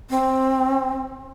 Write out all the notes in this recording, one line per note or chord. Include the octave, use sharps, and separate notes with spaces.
C4